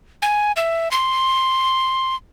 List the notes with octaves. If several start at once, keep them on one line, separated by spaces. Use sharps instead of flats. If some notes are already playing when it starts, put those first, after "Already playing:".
G#5
E5
C6